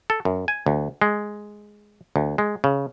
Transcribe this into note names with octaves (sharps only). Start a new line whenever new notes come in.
A4
F#2
G#5
D2
G#3
D2
G#3
C#3